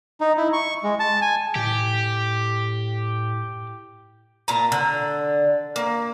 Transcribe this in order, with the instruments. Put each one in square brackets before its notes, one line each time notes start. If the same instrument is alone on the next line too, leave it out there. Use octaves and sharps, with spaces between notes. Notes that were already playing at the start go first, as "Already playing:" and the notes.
[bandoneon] D#4
E4
C#6
G#3
A5
G#5
[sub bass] A2 [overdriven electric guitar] G4
[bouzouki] A#2 A5 A#5
D3
A#3